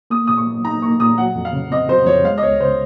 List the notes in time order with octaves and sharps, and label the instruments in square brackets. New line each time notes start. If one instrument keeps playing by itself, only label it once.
[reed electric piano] A#3 [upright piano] D#6
[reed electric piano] A#2 [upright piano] D#6
[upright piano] C#6
[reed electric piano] F#3
[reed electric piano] D#4 [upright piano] A#5
[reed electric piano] A#3 [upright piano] C#6
[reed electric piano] A#2 [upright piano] D#6
[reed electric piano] F#3 [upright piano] F#5
[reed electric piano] F2
[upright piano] F5
[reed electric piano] C#3
[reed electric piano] C4 [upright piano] D#5
[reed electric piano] F#3 [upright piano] C5
[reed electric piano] F2 [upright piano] C#5
[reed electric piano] G#3 [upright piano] F5
[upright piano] D#5
[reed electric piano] C#2 [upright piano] C#5
[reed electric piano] C#3 [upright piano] C5